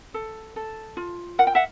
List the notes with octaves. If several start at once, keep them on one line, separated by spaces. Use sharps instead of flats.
A4
A4
F4
A#4 F#5
G5
E5 F#5